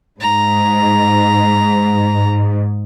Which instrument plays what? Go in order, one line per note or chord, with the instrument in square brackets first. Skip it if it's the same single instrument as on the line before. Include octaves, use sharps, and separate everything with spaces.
[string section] G#2 [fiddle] A#5